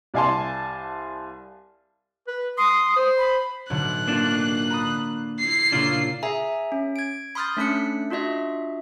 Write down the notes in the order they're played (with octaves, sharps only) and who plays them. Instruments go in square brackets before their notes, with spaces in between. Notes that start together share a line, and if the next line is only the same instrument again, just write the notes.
[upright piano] C2 D5 F5 G#5 A5 C6
[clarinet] B4
[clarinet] C6 [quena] D#6
[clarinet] C5
[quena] B5
[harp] B1 A2 D3 [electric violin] F#6
[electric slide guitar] A#3 D4 F4
[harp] A#5 B5 D#6
[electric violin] E4 C7
[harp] A#2 C#3 A#3 [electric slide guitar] D4 F4
[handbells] G#4 E5 G#5 A#5
C#4
G#6 D7
B5 C6 D#6 F6 G6 A6
A3 C#4 D4 F#6 B6 C#7
D4 F4 F#4 D#5 E5